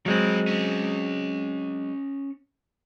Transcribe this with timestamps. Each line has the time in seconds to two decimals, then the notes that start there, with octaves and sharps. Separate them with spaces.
0.06 F3 F#3 G#3 C4 B5
0.47 C#4 D#5